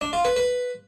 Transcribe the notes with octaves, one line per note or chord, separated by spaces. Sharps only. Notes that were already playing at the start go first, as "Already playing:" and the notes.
D4
F4
B4
B4